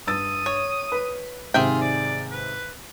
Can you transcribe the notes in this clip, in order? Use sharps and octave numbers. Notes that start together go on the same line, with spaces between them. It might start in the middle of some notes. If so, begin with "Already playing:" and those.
G2 D#6 E6 A6
C#5
B4
G#2 C3 D#3 F4 G#4 E5 G5
D5
B4